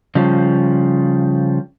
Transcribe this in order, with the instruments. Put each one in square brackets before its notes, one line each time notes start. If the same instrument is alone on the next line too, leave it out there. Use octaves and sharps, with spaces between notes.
[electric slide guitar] C#3 F3 G3